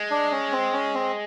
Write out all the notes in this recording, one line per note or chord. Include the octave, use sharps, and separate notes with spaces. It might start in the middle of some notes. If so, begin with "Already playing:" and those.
Already playing: G#3
D4
C#4
C4
C#4
C4